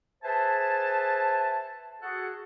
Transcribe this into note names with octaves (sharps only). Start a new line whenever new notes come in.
G#4 B4 C5 E5 G#5 A5
F#4 G#4 A4 F#5